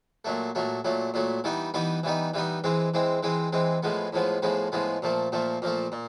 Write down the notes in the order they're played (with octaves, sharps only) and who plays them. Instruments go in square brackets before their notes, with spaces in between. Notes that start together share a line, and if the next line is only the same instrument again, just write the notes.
[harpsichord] A#2 F#3 A3
A#2 F#3 A3
A#2 F#3 A3
A#2 F#3 A3
E3 G3 B3 D#4
E3 G3 B3 D#4
E3 G3 B3 D#4
E3 G3 B3 D#4
E3 G#3 C4
E3 G#3 C4
E3 G#3 C4
E3 G#3 C4
A2 F3 G#3 B3
A2 F3 G#3 B3
A2 F3 G#3 B3
A2 F3 G#3 B3
A#2 F3 A3
A#2 F3 A3
A#2 F3 A3
A#2